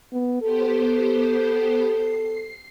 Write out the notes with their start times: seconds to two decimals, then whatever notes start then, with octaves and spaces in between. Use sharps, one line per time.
0.13 B3
0.42 B3 G4 A4 C5
1.90 C7